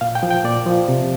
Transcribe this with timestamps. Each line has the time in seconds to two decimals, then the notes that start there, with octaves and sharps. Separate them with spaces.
0.01 A#2 F5
0.15 G5
0.23 F3
0.31 G5
0.45 A#2 D5
0.66 F3
0.88 C3